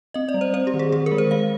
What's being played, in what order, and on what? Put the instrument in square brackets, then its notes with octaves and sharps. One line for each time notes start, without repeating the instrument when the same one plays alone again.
[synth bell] C4 D#5
D5
G3
C5
C4 C5
G4
D#3
G#4
D#3 G#4
A#4
G#3
C5
G#3 F5